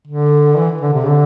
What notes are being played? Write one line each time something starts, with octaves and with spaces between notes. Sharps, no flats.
D3
E3
D3
C3
D3